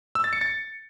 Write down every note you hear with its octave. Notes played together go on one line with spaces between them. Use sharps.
E6
A6
C#7
A6